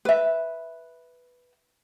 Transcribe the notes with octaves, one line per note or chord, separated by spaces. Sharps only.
B4 E5